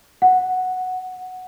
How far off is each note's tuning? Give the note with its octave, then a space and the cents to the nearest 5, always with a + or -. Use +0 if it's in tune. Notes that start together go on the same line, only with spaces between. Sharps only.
F#5 -5